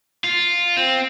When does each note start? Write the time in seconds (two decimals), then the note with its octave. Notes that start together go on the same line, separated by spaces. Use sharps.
0.24 F4
0.77 C4